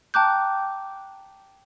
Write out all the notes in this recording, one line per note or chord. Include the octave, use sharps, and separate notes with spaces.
G5 A5 A#5 D6 F#6 G6